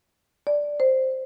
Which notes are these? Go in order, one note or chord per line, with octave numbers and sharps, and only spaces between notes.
D5
C5